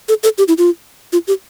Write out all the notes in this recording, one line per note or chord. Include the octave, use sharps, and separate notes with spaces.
A4
A4
G4
E4
F4
F4
G4